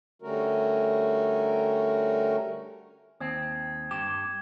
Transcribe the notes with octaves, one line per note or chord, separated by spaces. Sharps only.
D3 G3 A3 C#4 F#4 A#4
D#2 C4 D#6 G#6
G2 G4 G#6 E7